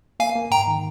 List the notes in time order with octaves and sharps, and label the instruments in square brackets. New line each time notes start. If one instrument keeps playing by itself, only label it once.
[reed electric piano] A#3 [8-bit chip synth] F5 G#5
[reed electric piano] A#3
[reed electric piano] G#2 [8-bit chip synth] G5 A#5
[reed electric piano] D#3